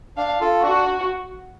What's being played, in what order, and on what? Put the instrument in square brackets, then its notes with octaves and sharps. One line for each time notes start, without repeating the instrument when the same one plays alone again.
[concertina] D4 [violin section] F5
[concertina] F4 A4
[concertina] D4 [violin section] F#4